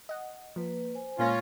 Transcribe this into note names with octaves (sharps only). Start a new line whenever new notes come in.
D#5 F#5
F3 A#3 B4
C5 G#5
A#2 G#3 A#3 C#4 F4 C#5 A#6